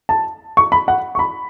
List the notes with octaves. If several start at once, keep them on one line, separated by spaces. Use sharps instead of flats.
A5
C#6
B5
F#5
C#6
B5